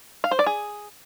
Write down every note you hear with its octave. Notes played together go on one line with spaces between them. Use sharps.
F5
C5
D5
G#4